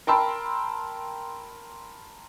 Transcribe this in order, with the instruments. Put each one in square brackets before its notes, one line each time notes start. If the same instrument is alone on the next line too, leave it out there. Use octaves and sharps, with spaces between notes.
[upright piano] A#4 G5 A5 B5 C6 E6